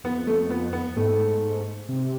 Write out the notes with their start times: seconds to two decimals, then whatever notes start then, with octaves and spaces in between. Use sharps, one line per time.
0.04 F2 B3
0.27 A3
0.50 B3
0.73 B3
0.96 G#2 A3
1.89 C3